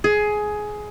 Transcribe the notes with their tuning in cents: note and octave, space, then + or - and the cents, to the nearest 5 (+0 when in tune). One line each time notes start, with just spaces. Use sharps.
G#4 +15